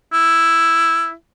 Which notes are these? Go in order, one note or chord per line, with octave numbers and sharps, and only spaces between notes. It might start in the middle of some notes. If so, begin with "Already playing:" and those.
E4